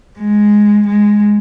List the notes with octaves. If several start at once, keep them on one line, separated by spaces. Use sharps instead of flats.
G#3
G#3